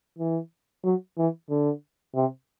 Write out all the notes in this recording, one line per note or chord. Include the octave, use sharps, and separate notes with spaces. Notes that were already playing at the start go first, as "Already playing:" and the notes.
E3
F#3
E3
D3
C3